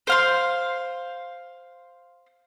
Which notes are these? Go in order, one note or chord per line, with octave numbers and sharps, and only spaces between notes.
C5 F5 C6